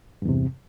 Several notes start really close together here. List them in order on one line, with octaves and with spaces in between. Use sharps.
G2 E2 C3